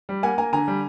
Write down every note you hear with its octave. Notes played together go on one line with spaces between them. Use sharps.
G3
A#3 F#5 G#5
A#3 G#5 A#5
D3 G#5 A#5
G3